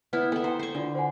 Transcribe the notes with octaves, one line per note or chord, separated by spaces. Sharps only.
B3 E4 B4
B3 A4 E5 G5
E4 C5 G5
C5 C#6
D3 D4 F4
C5 F#5 G#5